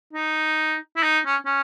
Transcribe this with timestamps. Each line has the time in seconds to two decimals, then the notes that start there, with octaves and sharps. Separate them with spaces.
0.13 D#4
0.96 E4
1.03 D#4
1.26 C#4
1.46 C#4